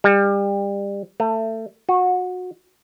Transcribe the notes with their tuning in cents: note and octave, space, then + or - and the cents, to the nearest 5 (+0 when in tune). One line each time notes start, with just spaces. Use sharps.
G3 +30
A3 +25
F#4 -25